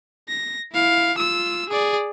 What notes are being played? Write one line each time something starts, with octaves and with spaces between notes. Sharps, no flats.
A#6
E4 F5
F4 E6
G#4 D5